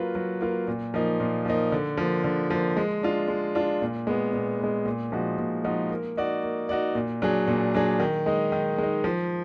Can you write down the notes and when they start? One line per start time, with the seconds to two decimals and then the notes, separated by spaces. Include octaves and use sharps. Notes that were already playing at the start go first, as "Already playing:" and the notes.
Already playing: F#3 A#3 F4 B4
0.15 F#3
0.41 A#3 F4 B4
0.68 A#2
0.94 F3 A#3 D#4
1.20 A#2
1.45 F3 A#3 D#4
1.72 D3
1.97 F3 A#3
2.24 D3
2.50 F3 A#3
2.77 G#3
3.03 D4 F4
3.28 G#3
3.55 D4 F4
3.82 A#2
4.07 G#3 B3
4.33 A#2
4.60 G#3 B3
4.85 A#2
5.12 F3 G#3 D#4 F#4
5.38 A#2
5.64 F3 G#3 D#4 F#4
5.91 A#3
6.17 D#4 F#4 D5
6.43 A#3
6.69 D#4 F#4 D5
6.95 A#2
7.22 F#3 D4 G#4
7.48 A#2
7.74 F#3 D4 G#4
8.00 D#3
8.26 G#3 D#4
8.52 D#3
8.78 G#3 D#4
9.04 F3